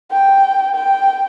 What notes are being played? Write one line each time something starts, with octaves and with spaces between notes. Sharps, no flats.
G5
G5